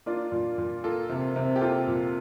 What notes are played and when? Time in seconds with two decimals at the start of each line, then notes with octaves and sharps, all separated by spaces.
0.06 A#3 D4 F4
0.32 A#2
0.58 A#2
0.84 A#3 F4 A4
1.09 C3
1.36 C3
1.56 G4
1.61 A#3 F4 A4
1.87 A#2